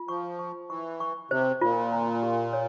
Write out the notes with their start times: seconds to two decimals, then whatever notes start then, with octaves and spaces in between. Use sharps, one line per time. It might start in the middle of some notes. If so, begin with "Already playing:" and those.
Already playing: F4
0.08 F3 C#6
0.39 C#6
0.70 E3 C#6
1.00 C#6
1.31 C3 C5
1.61 A#2 F4
1.92 A#5
2.23 G4
2.53 C#5